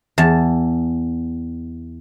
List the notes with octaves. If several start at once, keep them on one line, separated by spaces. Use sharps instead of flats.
E2 A5